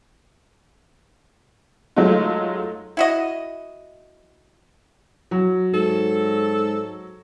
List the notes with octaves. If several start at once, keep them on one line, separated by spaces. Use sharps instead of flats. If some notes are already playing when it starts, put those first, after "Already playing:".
F#3 G#3 A3 D#4 F4
E4 F#4 D#5
F#3
G#2 A4